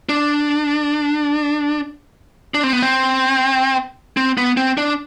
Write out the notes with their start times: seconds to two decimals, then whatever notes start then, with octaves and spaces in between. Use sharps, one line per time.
0.09 D4
2.54 D4
2.63 C4
2.73 B3
2.83 C4
4.17 C4
4.38 B3
4.57 C4
4.78 D4